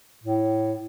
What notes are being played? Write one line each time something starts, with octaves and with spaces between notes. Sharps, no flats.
A2